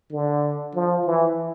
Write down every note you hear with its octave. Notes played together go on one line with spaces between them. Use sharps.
D3
F3
E3